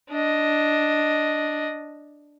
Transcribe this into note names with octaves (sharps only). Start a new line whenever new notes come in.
D4 D#5